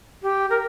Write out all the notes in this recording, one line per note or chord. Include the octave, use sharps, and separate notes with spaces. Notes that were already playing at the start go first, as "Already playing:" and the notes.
G4
A#4